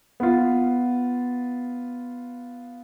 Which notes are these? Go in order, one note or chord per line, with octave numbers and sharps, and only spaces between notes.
B3 F4